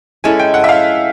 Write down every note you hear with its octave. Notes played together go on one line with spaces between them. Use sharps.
G#3 C#4 E4 A4 G#5
G5
F#5
E5
F5